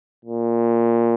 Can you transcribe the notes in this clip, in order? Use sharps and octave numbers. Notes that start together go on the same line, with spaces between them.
A#2